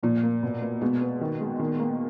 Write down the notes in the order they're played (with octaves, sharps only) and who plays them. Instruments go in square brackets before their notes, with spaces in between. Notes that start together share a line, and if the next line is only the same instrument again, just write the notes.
[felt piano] A#2 [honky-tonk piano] F3
[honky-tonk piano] A#3
B2
A#3
[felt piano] B2 [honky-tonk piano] G#3
[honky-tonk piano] B3
D#3
G#3
D#3
A#3